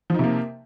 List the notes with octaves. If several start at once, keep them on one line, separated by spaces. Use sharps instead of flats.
C3 F3 A#3 D#4